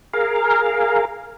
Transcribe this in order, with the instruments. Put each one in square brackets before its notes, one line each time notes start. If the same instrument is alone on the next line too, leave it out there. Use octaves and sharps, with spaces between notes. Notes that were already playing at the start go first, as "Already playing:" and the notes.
[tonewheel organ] G#4 A#4 F5